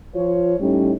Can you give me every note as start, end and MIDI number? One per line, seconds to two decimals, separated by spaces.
0.15 0.56 53
0.15 0.56 65
0.15 0.56 73
0.60 0.93 45
0.60 0.93 55
0.60 0.93 61
0.60 0.93 63